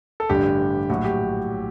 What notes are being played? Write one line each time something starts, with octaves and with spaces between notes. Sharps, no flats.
A4
A1 G2 D3 G4
A#1 A2 F#3 F#4
G4